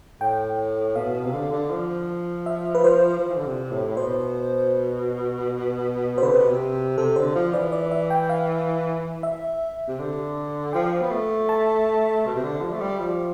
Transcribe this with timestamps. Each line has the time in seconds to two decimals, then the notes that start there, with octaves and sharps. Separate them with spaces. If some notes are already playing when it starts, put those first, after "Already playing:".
0.20 A2 G5
0.95 B2 F5
1.15 B2
1.24 C3
1.33 D3
1.52 D3
1.71 F3
2.46 E5
2.75 B4
2.84 C5
3.19 F3
3.29 E3
3.37 D3
3.46 C3
3.72 A2
3.87 A2
3.97 B2 C5
6.18 C5
6.22 D3 B4
6.31 C3
6.39 B2
6.48 C3
6.98 C3 A4
7.16 D3 C5
7.35 F3
7.53 E3 D5
7.72 D5
7.91 E5
8.10 G5
8.30 F5
9.23 E5
9.88 C3
9.99 D3
10.73 F3 G5
11.02 B3
11.11 A3
11.49 A5
12.27 B2
12.35 C3
12.43 D3
12.61 F3
12.72 A3
12.81 G3
13.00 F3